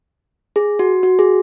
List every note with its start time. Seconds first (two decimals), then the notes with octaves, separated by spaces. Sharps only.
0.56 G#4
0.79 F#4
1.03 F#4
1.19 G#4